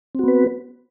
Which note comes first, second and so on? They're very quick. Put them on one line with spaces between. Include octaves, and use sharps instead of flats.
C4 F#4 B3 B4